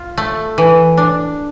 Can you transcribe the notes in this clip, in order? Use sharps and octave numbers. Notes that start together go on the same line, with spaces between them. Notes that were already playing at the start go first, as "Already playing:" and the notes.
Already playing: F4
A3
E3
D4